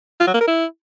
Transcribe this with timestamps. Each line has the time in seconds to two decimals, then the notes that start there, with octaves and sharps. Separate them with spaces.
0.20 F4
0.27 F#3
0.34 A#3
0.41 A#4
0.47 E4